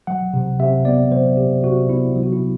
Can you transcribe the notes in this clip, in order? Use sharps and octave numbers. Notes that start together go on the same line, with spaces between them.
F#3 F#5
C3
C3 E5
B3 D5
F#3 C5
C3 G4
C3 F#4
B3 E4
F#3
F#4
E4